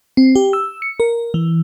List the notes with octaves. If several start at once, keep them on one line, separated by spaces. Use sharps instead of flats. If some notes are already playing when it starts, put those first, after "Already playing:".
C4
G4
E6
C#7
A#4
E3